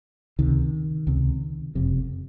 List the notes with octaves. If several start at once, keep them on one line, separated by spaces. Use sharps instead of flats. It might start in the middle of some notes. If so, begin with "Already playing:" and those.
C#2 C3 D#3
C#2 C3
F#1 F2 C3